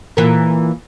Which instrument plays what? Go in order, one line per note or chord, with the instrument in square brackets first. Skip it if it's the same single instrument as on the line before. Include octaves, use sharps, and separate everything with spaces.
[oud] A#2 E3 A#4